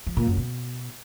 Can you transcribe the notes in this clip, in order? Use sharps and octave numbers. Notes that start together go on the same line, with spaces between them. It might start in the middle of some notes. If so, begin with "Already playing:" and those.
F3
A#2
F#2
B2